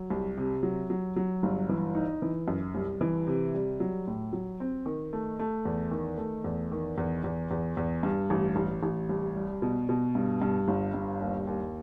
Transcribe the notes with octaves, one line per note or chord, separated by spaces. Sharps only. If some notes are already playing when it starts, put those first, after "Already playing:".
Already playing: F#3
C2
C3
F#3
F#3
F#3
G1
E3
D#4
E3
F#2
C2
E3
C3
G3
F#3
A2
F#3
C4
D#3
A3
A3
E2
D#3
A3
E2
D#3
E2
E2
E2
E2
G2
A1
A1
A1
C2
G3
B2
B2
G2
G2
G1
G2
D#2
D#2